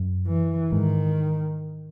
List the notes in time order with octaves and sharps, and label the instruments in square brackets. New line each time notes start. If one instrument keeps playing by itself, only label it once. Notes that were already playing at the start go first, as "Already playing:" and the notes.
Already playing: [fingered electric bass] F#2
[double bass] E3
[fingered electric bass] G#2 [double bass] D#3